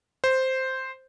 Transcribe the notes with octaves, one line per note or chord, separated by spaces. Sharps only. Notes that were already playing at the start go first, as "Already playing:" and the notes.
C5